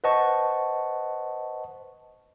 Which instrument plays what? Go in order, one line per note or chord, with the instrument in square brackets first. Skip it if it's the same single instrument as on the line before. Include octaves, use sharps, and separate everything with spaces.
[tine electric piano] B4 C5 D#5 F#5 A5 C#6